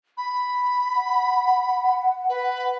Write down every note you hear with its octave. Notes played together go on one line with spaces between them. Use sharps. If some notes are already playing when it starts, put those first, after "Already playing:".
B5
F#5
B4